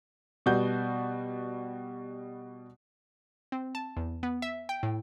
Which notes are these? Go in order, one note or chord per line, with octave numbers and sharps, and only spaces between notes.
B2 G3 F#4 G6
C4
A5
E2
B3
E5
G5
A2